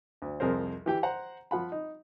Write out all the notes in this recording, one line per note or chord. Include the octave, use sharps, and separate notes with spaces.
D2
C2 F2 G#4 A#4 C5
E3 G4 G5
C5 F#5 A#5
F3 F#5 B5
D#4